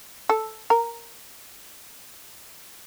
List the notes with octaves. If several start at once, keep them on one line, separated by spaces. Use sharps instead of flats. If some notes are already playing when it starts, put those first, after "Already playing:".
A4
A#4